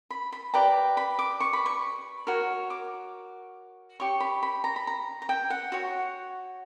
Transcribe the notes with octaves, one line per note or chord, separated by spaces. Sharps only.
B5
B5
G4 B4 D5 A#5
B5
D6
C#6
B5
C#6
F#4 A#4 C#5
D6
G4 C#5 C#6
B5
B5
A#5
B5
A#5
A#5
G5
F#5
F#4 C#5